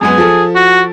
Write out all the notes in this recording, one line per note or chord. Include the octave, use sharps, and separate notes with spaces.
F#2 G#3 B3 G#4
F3 A4
F#4